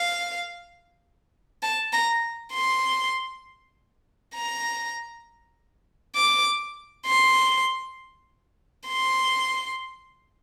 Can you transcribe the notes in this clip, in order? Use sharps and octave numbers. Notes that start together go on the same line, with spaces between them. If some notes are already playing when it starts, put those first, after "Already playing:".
Already playing: F5
A5
A#5
C6
A#5
D6
C6
C6